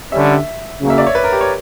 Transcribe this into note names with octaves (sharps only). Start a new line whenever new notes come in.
D3 G3 C#4 E5
C#3 F#3 A#3
E5
D5
C#5
B4
A#4
G4
C#5